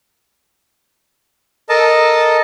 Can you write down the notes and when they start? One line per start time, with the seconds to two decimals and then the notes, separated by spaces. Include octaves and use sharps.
1.69 A4 A#4 D#5 A5